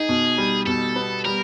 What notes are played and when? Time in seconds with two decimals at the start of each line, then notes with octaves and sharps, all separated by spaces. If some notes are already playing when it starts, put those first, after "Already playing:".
Already playing: D#4 G#4
0.09 B2
0.38 G3
0.66 B2 A4
0.96 B3
1.25 G3 A#4